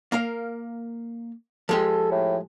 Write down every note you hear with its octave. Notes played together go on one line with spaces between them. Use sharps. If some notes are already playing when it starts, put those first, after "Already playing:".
A#3 A#4 F5
F3 G#3 G4 A4
A2